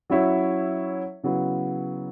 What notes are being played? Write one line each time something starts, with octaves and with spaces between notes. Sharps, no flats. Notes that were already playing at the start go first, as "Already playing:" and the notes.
F#3 C#4 E4 C#5 E5
C#3 F#3 B3 E4